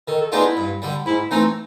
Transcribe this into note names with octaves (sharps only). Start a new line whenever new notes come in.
D#3 A4
A4
G#3 B3 D4 D#4 F4
E4
G2
D3 G3
G#2 E4
E3 A3 C4 D#4